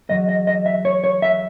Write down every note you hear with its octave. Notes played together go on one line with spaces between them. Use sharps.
E2 B2 F#3 D#5
D#5
D#5
E5
C#5
C#5
E5